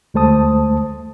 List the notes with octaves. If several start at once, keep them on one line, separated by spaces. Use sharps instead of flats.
D2 G#3 A3 C5 A5 D#6